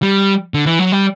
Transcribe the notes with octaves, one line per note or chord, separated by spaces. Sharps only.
G3
D3
E3
F#3
G3